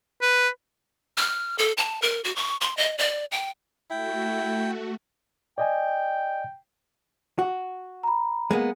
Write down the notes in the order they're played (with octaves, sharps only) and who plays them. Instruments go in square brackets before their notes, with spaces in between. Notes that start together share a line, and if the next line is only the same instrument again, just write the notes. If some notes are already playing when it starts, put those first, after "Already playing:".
[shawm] B4
[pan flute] F6
A4
A5
A#4
F#4
C#6
C6
D#5
D5
G5
[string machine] A3 F#4 [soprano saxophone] E4 [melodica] G5
[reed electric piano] D5 D#5 G#5 [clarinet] G5
[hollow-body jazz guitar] F#4
[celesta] A#5 B5
[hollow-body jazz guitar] G#3 A#3 B3